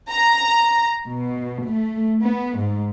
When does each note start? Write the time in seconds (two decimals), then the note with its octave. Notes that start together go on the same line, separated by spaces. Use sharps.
0.11 A#5
1.07 B2
1.66 A3
2.22 B3
2.57 G#2